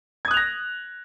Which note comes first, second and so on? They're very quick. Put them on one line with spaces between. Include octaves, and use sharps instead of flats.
G#6 D#6 F#6 F7 A#6